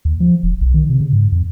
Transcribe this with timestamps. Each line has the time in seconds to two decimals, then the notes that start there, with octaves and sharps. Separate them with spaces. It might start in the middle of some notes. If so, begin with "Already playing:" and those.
0.05 D#2
0.20 F3
0.43 D#1
0.61 B1
0.74 D#3
0.89 C3
1.01 C#3
1.13 G#2
1.32 F2